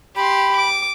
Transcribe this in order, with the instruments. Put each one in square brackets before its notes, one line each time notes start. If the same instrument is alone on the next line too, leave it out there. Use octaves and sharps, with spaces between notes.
[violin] G4 C6 [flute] B5
[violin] D6